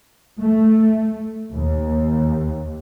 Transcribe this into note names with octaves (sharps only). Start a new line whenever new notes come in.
A3
D#2